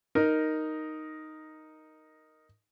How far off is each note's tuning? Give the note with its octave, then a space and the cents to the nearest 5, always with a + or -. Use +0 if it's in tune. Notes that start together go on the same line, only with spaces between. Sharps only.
D#4 +0 A#4 +0